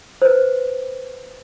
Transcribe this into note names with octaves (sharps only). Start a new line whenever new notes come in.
B4 C5